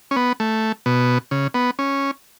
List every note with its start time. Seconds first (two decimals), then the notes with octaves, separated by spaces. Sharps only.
0.11 C#4
0.16 B3
0.40 A3
0.86 B2
1.31 C#3
1.54 B3
1.79 C#4